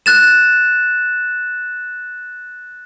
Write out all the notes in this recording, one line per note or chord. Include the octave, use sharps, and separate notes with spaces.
F#6 A6 E7